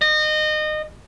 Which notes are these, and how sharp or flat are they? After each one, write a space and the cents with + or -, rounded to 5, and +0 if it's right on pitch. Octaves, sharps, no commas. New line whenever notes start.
D#5 -25